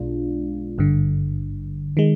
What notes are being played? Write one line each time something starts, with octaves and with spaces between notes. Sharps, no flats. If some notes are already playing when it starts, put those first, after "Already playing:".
Already playing: B1 B2 G#3 D4 F4
G#1 G2 D3
D#3 G#3